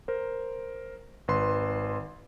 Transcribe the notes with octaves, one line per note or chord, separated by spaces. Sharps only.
A#4 C5
G#1 B4 C6